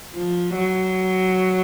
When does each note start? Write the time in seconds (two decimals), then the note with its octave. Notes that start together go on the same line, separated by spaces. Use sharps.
0.15 F3
0.55 F#3